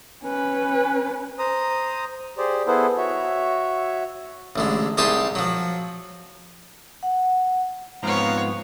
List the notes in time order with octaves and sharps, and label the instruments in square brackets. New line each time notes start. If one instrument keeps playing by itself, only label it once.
[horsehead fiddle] C#4 B4
[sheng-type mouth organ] C5 A#5 D#6
G4 G#4 C5 D5
B3 E4 G#4 A4 B4 C5
F#4 C#5 E5
[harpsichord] A1 D3 G#3
C2 D#4 G4 G#4 A5 C6
F3 F#3
[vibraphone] F#5
[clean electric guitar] G#2 F3 C4 [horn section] B3 F5 [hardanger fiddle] C#5 A#5